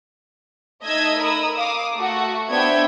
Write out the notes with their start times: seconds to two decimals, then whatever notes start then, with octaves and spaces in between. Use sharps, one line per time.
0.83 A3 D#4 D#5 E6 G#6 B6
1.20 A#4 B5 D#6 E6
1.56 F5 D6 D#6
1.95 A3 F#4
2.49 B3 D4 C5 E5 G5 G#6